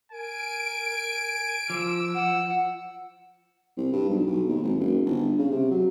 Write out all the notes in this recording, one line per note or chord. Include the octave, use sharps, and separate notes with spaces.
A#4 G#5 D7
F3 D6 E6
F#5
C2
G2
B1
B1
D#2
G#1
F#1
G1
C#3
C3
F#3